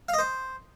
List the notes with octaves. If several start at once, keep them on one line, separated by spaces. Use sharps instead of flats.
F5
D#5
C5